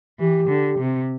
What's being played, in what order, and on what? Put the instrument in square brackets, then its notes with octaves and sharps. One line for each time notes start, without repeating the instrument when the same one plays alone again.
[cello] E3 [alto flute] G4
[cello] D3
C3